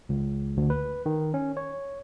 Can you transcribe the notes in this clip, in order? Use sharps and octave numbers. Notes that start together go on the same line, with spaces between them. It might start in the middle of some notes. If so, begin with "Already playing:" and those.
C#2
D2
B4
D#3
C#4
C#5